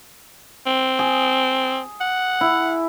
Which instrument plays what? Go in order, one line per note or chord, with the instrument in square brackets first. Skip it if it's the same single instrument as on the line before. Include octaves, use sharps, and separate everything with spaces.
[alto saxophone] C4
[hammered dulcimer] G#4
[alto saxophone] F#5
[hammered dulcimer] E4